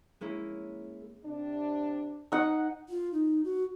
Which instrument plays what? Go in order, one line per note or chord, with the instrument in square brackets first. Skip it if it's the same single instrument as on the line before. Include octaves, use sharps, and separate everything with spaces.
[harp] G#3 A#3 C#4 E4
[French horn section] C3 D4
[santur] D#4 F#5
[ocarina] F4
D#4
F#4